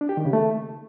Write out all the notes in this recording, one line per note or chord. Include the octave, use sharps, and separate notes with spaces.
D4
G4
D#3
C#3
A3